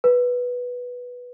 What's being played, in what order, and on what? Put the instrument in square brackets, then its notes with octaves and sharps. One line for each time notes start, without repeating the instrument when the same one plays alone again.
[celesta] B4